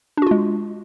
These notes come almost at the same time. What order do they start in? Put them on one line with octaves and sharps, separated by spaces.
D4 F#4 F4 G#3